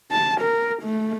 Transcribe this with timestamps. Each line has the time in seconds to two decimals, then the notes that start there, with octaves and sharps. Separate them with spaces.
0.11 A5
0.41 A#4
0.82 A3